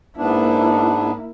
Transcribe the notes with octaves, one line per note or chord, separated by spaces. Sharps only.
G#2 A#3 B3 D4 E4